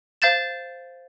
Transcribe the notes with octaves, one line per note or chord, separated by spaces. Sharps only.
C5 F5 G6 A6 E7